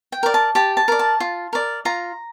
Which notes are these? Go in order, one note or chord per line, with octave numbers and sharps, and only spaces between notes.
G5
A#4 D5
A5
G4 A5
A5
A#4 D5
A5
F4
A#4 D5
F4 A#5